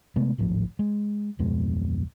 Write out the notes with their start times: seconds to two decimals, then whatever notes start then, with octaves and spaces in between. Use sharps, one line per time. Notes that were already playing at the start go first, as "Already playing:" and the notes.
0.16 C3 G#3 A3 B3
0.38 D1 G#1 A2 F3
0.79 G#3
1.39 D1 F2 B2 G#3